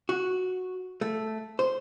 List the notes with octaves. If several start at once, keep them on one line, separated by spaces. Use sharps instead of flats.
F#4
A3
C5